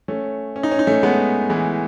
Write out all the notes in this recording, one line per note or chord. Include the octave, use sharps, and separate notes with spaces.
A3 C#4
C#4
D#4
C#4
D#4
A3 C#4
G#3 B3
E3 G#3